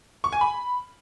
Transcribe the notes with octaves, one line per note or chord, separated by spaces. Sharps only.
C#6
G#5
B5